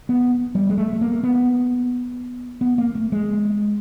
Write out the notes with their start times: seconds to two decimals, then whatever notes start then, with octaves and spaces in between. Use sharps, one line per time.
0.09 B3
0.55 G3
0.70 G#3
0.77 A3
0.93 A3
1.01 A#3
1.23 B3
2.61 B3
2.78 A#3
2.95 A3
3.12 G#3